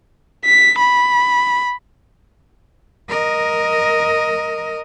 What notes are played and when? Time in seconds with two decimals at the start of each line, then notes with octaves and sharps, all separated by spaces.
0.45 B6
0.80 B5
3.09 A#4 D#5